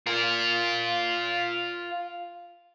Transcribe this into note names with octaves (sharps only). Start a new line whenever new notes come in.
F4 A#4